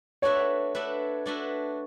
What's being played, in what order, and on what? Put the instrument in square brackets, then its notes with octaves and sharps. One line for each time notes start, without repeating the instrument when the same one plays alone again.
[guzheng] A3 D4 F#4 B4 E5 [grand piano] C#5
[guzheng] A3 D4 F#4 B4 E5
A3 D4 F#4 B4 E5